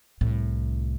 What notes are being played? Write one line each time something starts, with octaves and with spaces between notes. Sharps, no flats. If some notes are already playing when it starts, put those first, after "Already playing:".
C2 A2